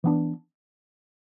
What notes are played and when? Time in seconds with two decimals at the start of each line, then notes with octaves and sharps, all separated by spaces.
0.04 E3 B3 D4